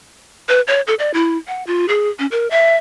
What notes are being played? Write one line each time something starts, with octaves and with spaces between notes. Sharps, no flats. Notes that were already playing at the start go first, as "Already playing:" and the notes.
B4
C#5
A4
D5
E4
F#5
F4
G#4
C#4
A#4
E5